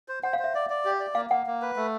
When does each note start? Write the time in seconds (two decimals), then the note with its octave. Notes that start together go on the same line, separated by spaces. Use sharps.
0.08 C5
0.23 C5 F#5
0.33 F5
0.39 C5
0.44 E5
0.55 D5
0.70 D5
0.85 G4
1.00 D5
1.15 A#3 F5
1.30 A#3 F#5
1.46 A#3
1.62 B4
1.76 A3